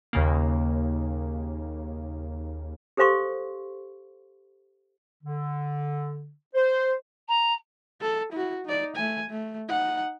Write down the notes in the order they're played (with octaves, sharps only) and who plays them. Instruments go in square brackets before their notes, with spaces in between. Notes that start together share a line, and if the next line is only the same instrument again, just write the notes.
[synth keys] D#2 C#3 A#3
[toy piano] G4 A4 C5 F5 C6 C#6
[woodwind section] D3
C5
[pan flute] A#5
[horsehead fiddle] A4
E4 F#4
D#4 D5
A3 G#5
A3
D#4 F#5